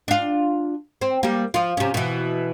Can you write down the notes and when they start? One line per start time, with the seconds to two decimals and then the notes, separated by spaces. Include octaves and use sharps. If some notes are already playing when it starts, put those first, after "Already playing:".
0.08 D4 F4
1.01 C4
1.23 G3 A#3
1.54 F3 F4
1.77 C3 C#4
1.94 B2 E3